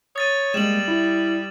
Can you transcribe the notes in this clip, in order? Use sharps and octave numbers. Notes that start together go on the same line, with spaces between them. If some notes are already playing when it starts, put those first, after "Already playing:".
C#5 D#6 A6 D#7
G3 G#3 A#3 E7 F#7
E4